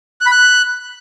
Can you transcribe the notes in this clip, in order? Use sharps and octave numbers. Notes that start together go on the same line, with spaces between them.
F#6
B5
F#6